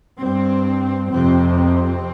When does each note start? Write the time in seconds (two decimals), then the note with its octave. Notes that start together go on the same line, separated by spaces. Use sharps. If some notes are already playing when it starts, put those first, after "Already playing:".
0.20 G2 C4
1.11 F2 C3 C4
1.57 C4